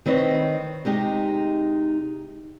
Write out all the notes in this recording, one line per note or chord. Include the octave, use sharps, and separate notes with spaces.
D#3 C4 B4 C#5 D#5
C3 G#3 D#4 G4